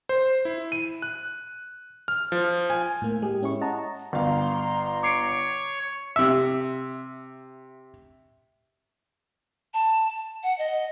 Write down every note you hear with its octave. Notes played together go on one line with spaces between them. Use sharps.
C5
E4
D#7
F#6
F6
F3
G#5
A2 A#3
G#3 G4 G#4
C#4 E4 C#6
D#5 F#5 A5 A#5
G1 F5 A#5 C6
C#5 D6 C7 D7
C3 E5
A5
F#5
D#5